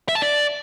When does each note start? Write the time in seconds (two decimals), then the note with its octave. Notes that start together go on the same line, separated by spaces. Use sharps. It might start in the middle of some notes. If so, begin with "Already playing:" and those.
0.09 E5
0.15 A5
0.22 D5